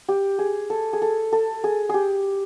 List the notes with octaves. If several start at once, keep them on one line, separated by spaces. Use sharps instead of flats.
G4
G#4
A4
G#4
A4
A4
G#4
G4 G#4